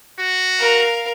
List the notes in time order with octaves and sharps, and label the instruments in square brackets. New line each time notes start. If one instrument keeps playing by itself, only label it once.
[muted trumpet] F#4
[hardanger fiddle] A#4 F5